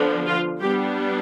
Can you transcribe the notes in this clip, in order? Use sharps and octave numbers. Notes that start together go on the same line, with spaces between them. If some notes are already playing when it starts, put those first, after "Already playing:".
Already playing: D3 F3 B3 D4
F4
G3 B3 D4 G4